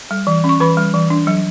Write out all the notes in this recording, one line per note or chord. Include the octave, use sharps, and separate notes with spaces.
G3
E3
C#4
C#6
E3 B4 B5
G3
E3
D4
F#3